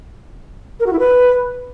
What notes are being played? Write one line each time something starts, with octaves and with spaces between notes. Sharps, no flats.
A#4
F#4
E4
B4